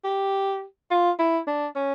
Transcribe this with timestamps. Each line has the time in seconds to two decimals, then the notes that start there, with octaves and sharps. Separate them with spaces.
0.04 G4
0.91 F4
1.19 E4
1.47 D4
1.76 C#4